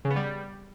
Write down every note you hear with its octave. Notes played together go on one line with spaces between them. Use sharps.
C#3
B3
G3